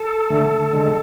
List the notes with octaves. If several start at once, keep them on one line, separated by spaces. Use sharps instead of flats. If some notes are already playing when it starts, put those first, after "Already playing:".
Already playing: A4
D3 A3
D3 G#3